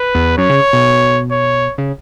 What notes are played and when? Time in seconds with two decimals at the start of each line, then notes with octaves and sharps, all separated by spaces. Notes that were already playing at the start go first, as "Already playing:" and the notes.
Already playing: B4
0.15 E2
0.38 F#2 C#5
0.49 C#3
0.73 B2
1.31 C#5
1.78 C#3